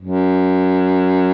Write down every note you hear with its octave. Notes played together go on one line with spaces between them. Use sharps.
F#2